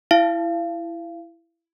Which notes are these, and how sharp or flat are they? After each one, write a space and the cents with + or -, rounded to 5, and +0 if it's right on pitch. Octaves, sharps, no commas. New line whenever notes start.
E4 +10 F5 -35